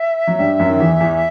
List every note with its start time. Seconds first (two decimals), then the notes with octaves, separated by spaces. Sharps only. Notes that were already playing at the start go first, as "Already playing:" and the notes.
Already playing: E5
0.28 F#3
0.39 G2 G3
0.59 F#2 F#3
0.70 D#3
0.80 E2 E3
1.00 E2 E3